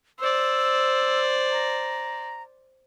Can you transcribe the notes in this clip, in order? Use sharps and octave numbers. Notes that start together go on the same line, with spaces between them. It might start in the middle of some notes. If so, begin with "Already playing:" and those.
C5 D5 E6
A#5